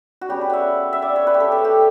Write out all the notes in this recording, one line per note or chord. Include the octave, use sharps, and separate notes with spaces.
F#4
C#3 G3 B3 G4
B4
E5 F#5
E5
D5
C#5
B4
G4
A4
A4
G4